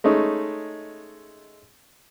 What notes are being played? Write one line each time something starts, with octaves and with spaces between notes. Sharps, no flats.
G#3 A3 C#4 D#4